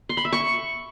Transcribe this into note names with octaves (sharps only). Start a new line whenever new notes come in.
C6
B5
E5
C#6